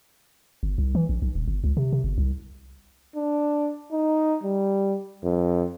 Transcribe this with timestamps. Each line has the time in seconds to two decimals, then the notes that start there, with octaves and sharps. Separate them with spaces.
0.63 G1
0.78 C2
0.95 E3
1.09 A#1
1.22 B1
1.35 D#1
1.48 G1
1.64 C#2
1.77 C3
1.92 C3
2.04 G1
2.18 C2
3.16 D4
3.92 D#4
4.43 G3
5.24 F2